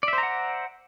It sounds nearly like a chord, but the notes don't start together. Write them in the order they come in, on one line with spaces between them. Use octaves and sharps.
D5 E5 C5 A#5 F#5